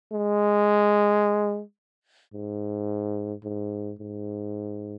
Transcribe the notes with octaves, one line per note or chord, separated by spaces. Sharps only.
G#3
G#2
G#2
G#2